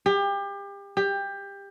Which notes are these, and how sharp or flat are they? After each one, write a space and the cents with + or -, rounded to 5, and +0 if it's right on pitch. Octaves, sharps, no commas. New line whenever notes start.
G4 +30
G4 +20